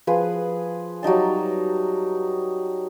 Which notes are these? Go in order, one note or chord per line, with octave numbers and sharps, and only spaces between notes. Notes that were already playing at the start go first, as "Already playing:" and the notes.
F3 G#4 B4
F#3 G3 D#4 A5